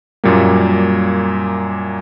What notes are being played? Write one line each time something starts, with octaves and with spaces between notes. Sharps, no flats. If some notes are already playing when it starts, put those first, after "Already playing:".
F#2 A#2 G3 A#3